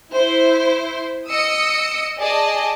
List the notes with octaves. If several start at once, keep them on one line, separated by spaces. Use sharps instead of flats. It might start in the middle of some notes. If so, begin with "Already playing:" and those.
E4 C5
D#5 D#6 E6 C#7
G#4 D5 D#5 A5